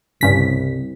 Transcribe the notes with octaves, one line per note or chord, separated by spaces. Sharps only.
C2 G2 C#3 B6